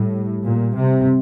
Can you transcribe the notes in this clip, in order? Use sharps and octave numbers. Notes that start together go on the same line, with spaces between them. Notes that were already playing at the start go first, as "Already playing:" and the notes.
Already playing: A2 G3
A#2
C3